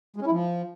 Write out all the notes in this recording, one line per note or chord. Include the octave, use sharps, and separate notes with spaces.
G#3
C#4
E4
F3